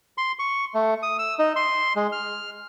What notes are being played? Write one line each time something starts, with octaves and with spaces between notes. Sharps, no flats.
C6
C#6
A3
D#6
E6
D#4
C6
G#3
F6